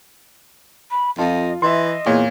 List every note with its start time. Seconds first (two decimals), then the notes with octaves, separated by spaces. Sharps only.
0.90 B5
1.18 F2 F4 D#5 A5
1.62 E3 D#5 E5 C6
2.06 E2 A#2 C#5